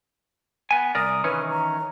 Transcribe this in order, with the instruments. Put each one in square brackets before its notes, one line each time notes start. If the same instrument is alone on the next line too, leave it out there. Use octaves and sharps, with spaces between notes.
[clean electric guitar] B3 G#5
[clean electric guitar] C2 A#4 D5 [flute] D#6
[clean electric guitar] D#3 E3 C#4 [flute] B4
[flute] A#5